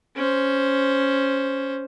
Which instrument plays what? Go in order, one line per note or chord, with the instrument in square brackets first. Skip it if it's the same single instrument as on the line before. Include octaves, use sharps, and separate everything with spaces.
[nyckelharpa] C#4 C5